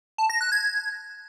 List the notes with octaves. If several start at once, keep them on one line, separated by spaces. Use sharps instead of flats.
A5
A#6
F#6
G#6